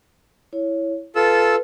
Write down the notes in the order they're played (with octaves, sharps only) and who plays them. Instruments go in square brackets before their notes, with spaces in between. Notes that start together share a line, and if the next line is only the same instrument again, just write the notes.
[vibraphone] E4 C#5
[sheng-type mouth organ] F4 A4 E6 [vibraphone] B4